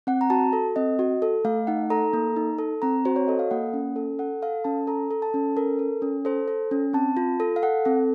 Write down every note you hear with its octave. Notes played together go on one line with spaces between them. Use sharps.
C4 F#5
A#5
F#4 A5
A4
C4 D#5
F#4
A4
A3 F5
D#4 F#5
A4 A#5
A#3
D#4
A4
C4 A#5
F#4 C5
C#5
A4 D#5
F5
A#3 F#5
C#4
A4
A4 F#5
A4 F5
C#4 A5
A4 A#5
A4
A5
C#4
A4 A#4
A4
C#4
A4 C5
A4
C#4
C4 A5
F4
A4
F5
A4 F#5
C4 A4